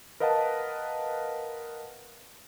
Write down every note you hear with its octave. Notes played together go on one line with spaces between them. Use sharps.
A#4 B4 D#5 F5 F#5 A5